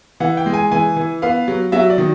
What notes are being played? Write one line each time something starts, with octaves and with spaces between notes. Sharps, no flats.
E3 F#5
G5
G#3
G#5
E3 G#5
E3
B3 F5
F#3
F#3 E5
D5
D#3